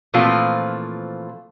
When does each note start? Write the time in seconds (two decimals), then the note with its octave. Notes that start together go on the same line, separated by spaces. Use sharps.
0.14 A#2 E3 F3 A3 C4 F4